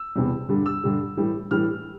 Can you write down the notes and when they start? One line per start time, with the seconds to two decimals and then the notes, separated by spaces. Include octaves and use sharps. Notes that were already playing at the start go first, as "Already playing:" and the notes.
Already playing: E6
0.16 E2 C3 E3 G3
0.49 G2 D3 G3
0.66 E6
0.84 G2 D3 G3
1.17 A2 E3 G3
1.51 A2 E3 G3 F6